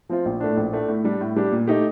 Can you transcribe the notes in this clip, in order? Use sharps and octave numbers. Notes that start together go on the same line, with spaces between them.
F3 C4 F4
A#1
A2 A3 D4
A#1
A2 A3 D4
A2
G3 D4 G4
A2
G3 D4 G4
A#2
A3 D#4 G4